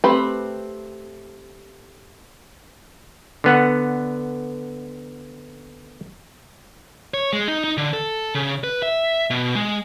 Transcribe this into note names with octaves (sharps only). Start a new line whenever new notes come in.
A3 C4 G4 B4 B5
D3 B3 F#5
C#5
G#3
D#4
D#4
D3
A4
C#3
B4
E5
B2
G#3